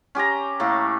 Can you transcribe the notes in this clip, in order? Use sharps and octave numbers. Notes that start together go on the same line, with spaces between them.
C#4 G4 C5 A#5
A2 A#3 A5